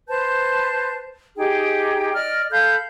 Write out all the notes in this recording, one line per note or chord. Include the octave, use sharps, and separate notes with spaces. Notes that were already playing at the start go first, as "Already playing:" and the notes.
B4 C5 A5 G6
D#4 G4 G#4 G5
D5 D#5 F6
A4 F5 B5 G6